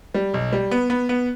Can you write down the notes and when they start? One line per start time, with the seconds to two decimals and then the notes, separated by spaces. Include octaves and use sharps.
0.14 G3
0.34 B1
0.53 G3
0.71 B3
0.90 B3
1.09 B3